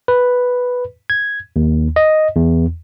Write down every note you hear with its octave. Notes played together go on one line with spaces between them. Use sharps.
B4
G#6
D#2
D#5
E2